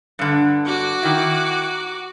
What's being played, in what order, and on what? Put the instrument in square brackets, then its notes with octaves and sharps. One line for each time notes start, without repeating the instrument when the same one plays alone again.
[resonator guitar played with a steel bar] G2 D3
[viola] F#4 D6
[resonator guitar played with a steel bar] D#3 E4